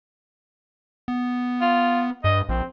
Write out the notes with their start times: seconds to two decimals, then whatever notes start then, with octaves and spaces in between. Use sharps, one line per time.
1.08 B3
1.61 F4
2.24 G2 D#5
2.49 A#1 C4